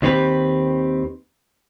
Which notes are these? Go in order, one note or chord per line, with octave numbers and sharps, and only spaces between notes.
D#2 D#3 C4 G4 B4